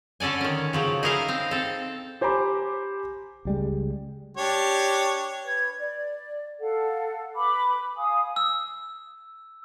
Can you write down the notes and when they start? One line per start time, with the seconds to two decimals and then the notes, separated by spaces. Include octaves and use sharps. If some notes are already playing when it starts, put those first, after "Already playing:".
0.20 D3 C#4 A4 D5 G#5
0.41 D#3 C#4
0.73 C#3 F3 F#3
1.03 D#4 E4 G#4 A#4 D#5 F5
1.28 C4 F5
1.51 C4 A4
2.21 G4 C5 G#5 A#5 B5 D6
3.45 C#2 G3 G#3
4.37 D4 G4 C#5
5.44 B4 G#6
5.79 D5
6.61 A4 F5 F#5
7.36 B4 B5 D6
7.97 F5 G#5 D#6
8.36 E6